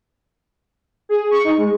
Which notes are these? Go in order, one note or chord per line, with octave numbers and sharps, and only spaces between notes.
G#4
C#6
D#4
G#3